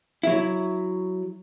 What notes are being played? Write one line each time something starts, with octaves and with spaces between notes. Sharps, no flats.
F#3 E4